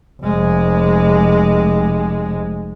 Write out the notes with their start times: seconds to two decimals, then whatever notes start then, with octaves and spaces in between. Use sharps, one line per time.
0.22 F1 G#3